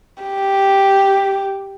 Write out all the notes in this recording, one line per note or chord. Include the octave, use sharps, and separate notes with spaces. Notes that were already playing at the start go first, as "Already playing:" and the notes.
G4